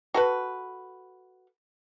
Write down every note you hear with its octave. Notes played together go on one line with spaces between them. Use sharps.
F#4 A4 B4